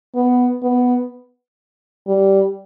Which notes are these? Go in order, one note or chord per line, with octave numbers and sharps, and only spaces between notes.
B3
B3
G3